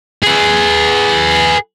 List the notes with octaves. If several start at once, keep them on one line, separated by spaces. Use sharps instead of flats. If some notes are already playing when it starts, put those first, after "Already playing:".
G#4 B4